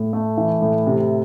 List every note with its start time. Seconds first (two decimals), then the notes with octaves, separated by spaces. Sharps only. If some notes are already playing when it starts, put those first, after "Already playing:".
Already playing: A2
0.13 A3
0.37 E3
0.62 A2
0.87 C3